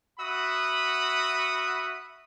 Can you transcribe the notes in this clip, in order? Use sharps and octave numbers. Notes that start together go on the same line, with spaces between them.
F#4 E5 F#5 B5 D#6